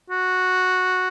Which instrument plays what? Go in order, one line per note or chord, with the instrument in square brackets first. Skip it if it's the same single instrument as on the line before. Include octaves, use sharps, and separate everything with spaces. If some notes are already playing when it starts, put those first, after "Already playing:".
[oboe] F#4